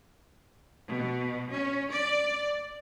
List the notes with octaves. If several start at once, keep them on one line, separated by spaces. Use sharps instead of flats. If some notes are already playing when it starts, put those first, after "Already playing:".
B2
C#4
D5